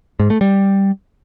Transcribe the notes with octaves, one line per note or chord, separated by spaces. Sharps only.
G#2
A3
G3